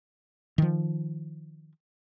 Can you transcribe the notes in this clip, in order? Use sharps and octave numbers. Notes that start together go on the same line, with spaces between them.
D#3 F3